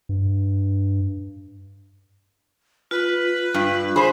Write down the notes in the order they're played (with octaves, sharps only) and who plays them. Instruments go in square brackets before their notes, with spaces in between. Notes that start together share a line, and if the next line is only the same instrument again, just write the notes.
[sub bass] G2
[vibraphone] F4 [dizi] B4
[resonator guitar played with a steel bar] G2
[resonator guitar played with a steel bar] G#4 C5 [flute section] B5